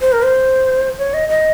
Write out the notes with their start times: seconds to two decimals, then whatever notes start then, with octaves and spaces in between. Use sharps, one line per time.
0.01 C5
0.12 A#4
0.23 C5
0.98 C#5
1.14 D#5
1.29 D#5